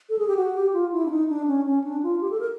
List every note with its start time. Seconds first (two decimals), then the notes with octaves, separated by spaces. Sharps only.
0.09 A4
0.18 G#4
0.27 G4
0.36 F#4
0.55 G4
0.73 F4
0.92 E4
1.06 D4
1.10 D#4
1.29 D4
1.48 C#4
1.66 C#4
1.84 D4
2.03 F4
2.21 G4
2.31 A4
2.40 A#4